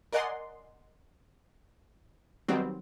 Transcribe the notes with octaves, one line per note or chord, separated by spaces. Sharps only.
A#4 D5 D#5 F#5 G#5 C6
D#3 F#3 G3 B3 C4